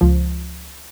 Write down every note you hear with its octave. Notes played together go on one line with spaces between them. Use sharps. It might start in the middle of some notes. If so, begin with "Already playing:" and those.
C#2 F3